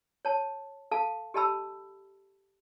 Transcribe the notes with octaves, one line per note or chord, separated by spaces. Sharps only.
C#5 A5
A4 F5 A5
G4 A4 D#5 A5 B5 E6